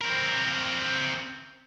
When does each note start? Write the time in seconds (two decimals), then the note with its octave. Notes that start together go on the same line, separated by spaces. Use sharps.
0.01 C4 A#4